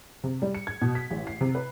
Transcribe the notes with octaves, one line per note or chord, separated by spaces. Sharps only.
C3
G3
C#7
G#6
B2
B6
A1
C7
C3
B4